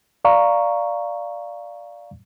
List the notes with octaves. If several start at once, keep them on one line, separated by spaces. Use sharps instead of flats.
D5 F5 A#5 C#6